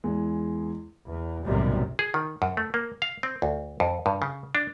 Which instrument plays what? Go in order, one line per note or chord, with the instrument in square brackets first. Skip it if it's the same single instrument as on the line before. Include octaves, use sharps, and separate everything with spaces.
[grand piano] E2 E3 G#3
[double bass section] E2
B1 F#2 A2 C3 D#3 G3
[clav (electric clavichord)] G#4
D#3
F#2
A3
A#3
F5
C4
D2
F2
G2
C#3
D4